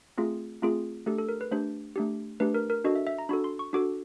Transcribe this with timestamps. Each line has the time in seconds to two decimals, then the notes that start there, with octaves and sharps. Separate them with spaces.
0.18 A3 C4 F4 G#4
0.62 A3 C4 F4 G#4
1.06 A3 D4 G4 A4
1.18 A4
1.29 A#4
1.41 B4
1.51 A3 D4 G4 C5
1.96 A3 D4 G4
2.40 A3 D4 G4 B4
2.55 A#4
2.70 A#4
2.85 D4 F#4 A4 D#5
2.96 E5
3.07 E5
3.19 A#5
3.29 D4 F#4 A4 B5
3.44 C6
3.59 C#6
3.73 D4 F#4 A4 D6